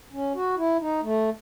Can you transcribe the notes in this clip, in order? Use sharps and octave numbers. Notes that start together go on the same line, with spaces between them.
C#4
F#4
E4
D#4
A3